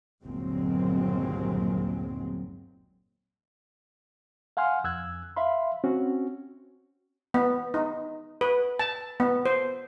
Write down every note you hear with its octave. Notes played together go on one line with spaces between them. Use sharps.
G1 D#2 A#2 F#3 G#3 C4
F5 F#5 G#5 C6 F6
F2 E6 F#6 G#6
E5 F5 B5 C6
C4 C#4 F#4
B3
D#4
B4
A5
B3
C5